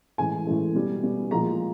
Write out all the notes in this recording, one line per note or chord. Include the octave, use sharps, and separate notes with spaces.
A2 E3 G#3 G#5
A2 E3 G#3
B2 G3
B2 G3
A#2 F3 G#3 A#5